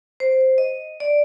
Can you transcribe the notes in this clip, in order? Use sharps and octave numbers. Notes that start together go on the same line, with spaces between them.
C5
D#5
D5